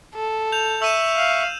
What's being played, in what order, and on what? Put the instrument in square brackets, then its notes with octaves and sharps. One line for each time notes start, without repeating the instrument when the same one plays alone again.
[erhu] A4
[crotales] G6 F7
[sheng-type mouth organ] E5 C#6 [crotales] E6 D#7 E7
[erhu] F5